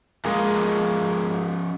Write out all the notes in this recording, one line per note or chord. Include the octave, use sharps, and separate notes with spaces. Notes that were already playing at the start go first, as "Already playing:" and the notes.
F3 G#3 A#3 C#4 D#5